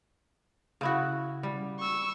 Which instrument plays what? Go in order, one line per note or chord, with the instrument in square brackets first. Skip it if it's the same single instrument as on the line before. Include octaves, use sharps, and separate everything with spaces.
[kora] C#3 E4 F#4
G3
[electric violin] C#6 E6